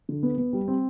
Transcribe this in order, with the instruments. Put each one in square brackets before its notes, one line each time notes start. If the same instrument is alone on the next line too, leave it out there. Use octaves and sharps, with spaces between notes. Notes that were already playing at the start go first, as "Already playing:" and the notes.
[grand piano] D3
B3
B3
G3
C4